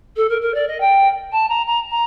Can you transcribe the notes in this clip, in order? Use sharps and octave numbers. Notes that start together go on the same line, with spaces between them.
A4
A#4
A#4
D5
D#5
G5
A5
A#5
A#5
A#5